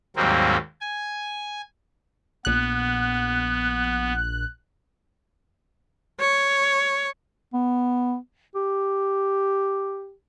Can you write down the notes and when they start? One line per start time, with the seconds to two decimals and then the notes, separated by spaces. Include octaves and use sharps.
0.16 D#2 G#2 F#3 G3 A#3 C4
0.81 G#5
2.45 A#1 B3 F#6
6.20 C#5
7.54 B3
8.55 G4